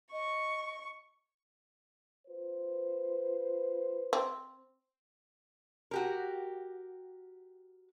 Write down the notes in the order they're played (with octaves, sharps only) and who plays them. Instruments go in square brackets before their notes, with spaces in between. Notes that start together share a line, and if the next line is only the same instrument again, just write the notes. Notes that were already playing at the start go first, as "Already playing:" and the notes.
[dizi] D#5 [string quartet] C#6
[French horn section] F4 B4 C5
[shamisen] C4
[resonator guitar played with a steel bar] F#4 G4 A#4